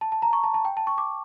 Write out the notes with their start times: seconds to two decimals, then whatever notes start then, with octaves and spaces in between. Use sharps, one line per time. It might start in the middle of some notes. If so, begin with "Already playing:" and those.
0.01 A5
0.12 A5
0.22 A#5
0.33 C#6
0.44 A5
0.54 A5
0.65 G5
0.77 A5
0.87 C#6
0.98 D6